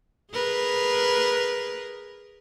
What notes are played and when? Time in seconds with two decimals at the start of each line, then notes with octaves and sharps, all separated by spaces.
0.32 G#4 A#4 B4